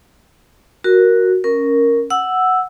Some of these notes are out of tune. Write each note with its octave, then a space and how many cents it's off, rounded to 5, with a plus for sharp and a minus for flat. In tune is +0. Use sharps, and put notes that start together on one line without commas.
F#4 +0 A#4 +0
C#4 +0 A#4 +0
F#5 +0 E6 +0